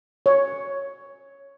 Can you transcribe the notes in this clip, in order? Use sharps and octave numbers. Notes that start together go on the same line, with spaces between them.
C#5